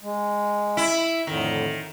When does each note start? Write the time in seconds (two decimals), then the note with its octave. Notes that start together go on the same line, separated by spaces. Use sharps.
0.03 G#3
0.77 E4
1.27 F2 A2 D3 D#3